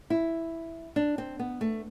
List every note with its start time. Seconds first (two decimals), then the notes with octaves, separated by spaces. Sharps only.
0.10 E4
0.96 D4
1.18 C4
1.39 B3
1.61 A3